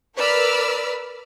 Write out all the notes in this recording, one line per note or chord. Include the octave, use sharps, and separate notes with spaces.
A#4 B4 D5 B5 E6 F6